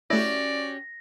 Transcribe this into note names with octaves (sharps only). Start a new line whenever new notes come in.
A3 C#4 E4 F#4 G4 D5 A#6